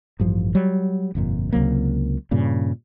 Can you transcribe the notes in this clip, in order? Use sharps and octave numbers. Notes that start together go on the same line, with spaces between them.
A1 G2 F3
F#3 G3
G1 F2 A#2
C#2 C3 F#3 A#3
G2 A#2 C#3